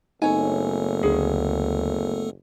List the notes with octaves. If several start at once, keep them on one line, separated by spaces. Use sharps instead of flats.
F#1 A3 B3 C4 D#4 A4 C#5 G#5
D2 D3 G#4